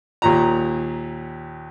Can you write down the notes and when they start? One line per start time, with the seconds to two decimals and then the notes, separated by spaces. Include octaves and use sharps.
0.22 D#2 A#2 A#5